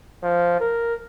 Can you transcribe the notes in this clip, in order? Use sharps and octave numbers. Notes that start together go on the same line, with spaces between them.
F3
A#4